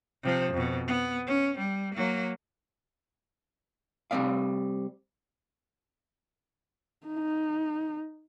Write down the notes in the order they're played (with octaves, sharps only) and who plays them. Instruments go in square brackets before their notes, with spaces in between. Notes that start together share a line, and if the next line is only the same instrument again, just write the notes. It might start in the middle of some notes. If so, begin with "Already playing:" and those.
[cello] C3 F3
F2 B2
B3
C#4
G3
F#3 A#3
[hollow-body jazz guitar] C3 G3 A3 C4 D5 F5
[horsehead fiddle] D#4